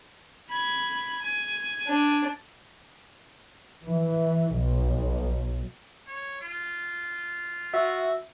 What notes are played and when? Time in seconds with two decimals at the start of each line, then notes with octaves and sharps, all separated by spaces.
0.50 B5 G#6
1.23 G#5
1.87 D4
3.84 E3
4.55 B1
6.07 C#5
6.41 F4
7.74 F#4 E5